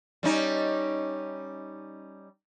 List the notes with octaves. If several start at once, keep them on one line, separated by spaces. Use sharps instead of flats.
G3 C#4 D#4